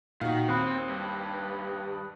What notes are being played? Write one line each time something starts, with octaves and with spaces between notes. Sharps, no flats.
A#2 D#3 F#4 F5
D#2 C4 B5 D#6 F#6
G2